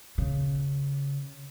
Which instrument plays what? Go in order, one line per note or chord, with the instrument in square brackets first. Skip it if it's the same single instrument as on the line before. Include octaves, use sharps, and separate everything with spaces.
[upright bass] C#3